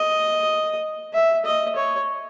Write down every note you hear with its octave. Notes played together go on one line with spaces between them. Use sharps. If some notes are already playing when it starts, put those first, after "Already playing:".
Already playing: D#5
E5
D#5
C#5